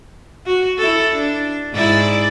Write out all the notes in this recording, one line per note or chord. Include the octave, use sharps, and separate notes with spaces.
F#4
E4 A4
D4
G#2 E4 D5